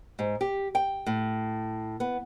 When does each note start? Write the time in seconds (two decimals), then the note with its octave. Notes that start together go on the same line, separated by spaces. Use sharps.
0.19 G#2
0.41 G4
0.75 G5
1.06 A2
2.00 B3